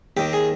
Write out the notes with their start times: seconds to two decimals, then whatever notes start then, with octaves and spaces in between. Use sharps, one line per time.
0.17 D#2 D#3 G4
0.33 G#4